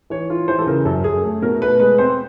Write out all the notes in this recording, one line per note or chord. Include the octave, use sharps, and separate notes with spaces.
E3 C#5
F4
E3 C5
A4
C#3 A#4
F#2 A4
F#2 G#4
A3
B2 A#4
A3 B4
G#3 B4
C4 C5